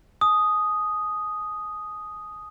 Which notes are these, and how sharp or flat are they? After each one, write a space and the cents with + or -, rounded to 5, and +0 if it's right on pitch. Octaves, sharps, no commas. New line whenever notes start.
G#5 +35 D#6 +0